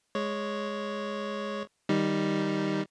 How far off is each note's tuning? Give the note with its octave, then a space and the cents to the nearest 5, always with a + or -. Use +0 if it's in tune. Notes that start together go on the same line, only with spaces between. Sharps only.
G#3 +0 C#5 +0
D#3 +0 G3 +0 D#4 +0